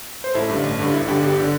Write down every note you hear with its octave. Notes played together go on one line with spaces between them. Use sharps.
C5
A1 E4 A4
G2 D3
A1
G2 D3
G1 E4
G2 D3 G4
G1 G4
D3